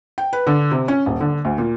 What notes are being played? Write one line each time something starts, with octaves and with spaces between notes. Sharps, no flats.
G5
B4
D3
C3
C#4
D#1
D3
D2
A#2